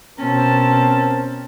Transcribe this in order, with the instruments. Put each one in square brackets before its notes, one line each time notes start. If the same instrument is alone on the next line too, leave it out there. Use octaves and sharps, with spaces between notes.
[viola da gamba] B2 C#4 [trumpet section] C4 A#4 A5